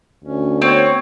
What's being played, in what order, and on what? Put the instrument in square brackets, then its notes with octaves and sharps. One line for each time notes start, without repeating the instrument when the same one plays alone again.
[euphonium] D2 [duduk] C#4
[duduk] B3 [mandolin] C4 [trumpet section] C#5